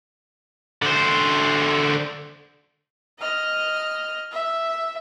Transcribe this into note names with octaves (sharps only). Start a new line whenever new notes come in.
D3 C5
D#5 F6
E5